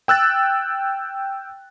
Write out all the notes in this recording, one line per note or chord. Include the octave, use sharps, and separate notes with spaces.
G5 E6 F#6 A6